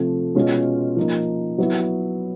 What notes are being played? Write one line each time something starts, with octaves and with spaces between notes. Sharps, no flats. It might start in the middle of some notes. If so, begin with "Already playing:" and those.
Already playing: C3 F3 A3
B2 G#3 C#4 F4
F3 A#3 D#4
F#3 B3 E4